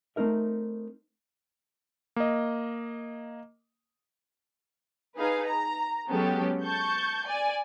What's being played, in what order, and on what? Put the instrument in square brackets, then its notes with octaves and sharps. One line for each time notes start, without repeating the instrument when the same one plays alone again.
[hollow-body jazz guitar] A3 C4 D#4 A#4 E5
[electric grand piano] A#3 D#5
[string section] D#4 G#4 B4 F5
A#5
F#3 G#3 B3 C#4 G4 A4
A5 C#6 G6
D5 G#5